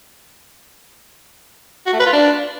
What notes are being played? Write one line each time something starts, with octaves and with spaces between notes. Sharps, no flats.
F#4
A3
B4
F4
D4